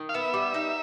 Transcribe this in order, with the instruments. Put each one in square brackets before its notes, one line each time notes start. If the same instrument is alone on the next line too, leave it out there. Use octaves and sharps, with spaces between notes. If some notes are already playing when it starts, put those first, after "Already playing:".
Already playing: [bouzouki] D#3
[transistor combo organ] F5
[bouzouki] B3 [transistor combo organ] E5
[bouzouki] G3
D#4